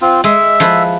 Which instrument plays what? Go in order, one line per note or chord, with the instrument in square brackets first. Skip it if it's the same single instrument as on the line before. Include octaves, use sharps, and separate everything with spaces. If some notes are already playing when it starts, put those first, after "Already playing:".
[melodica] C4 F4
[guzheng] G#3 [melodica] E5
[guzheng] F3 E4 B4